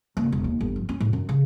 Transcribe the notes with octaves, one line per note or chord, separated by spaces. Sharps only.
F#1
E1
D#2
G1
F3
C#4
G#2
F#2
C#3